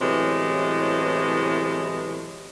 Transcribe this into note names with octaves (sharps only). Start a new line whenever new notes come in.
A2 C3 E3 F#3 G#3 B3